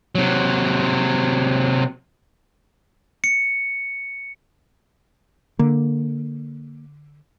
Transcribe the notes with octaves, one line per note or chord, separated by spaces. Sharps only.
C3 F#3
C#7
D3 A#3